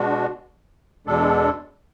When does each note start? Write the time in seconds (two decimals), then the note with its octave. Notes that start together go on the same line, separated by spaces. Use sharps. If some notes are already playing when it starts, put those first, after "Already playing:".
Already playing: B2 G#3 D4 F#4
1.07 E2 B2 G#3 D4 A4